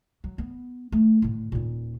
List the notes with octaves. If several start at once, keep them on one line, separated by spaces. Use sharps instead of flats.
F#3
B3
A3
A2 D3
D#1 A#2